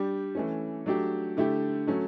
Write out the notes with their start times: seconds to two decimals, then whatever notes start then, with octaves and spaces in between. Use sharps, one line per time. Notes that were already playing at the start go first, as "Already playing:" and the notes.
Already playing: G3 D4 G4
0.35 E3 A3 C#4
0.86 F#3 A3 D4 G4
1.37 D3 A3 E4 G4
1.87 F#3 A3 C#4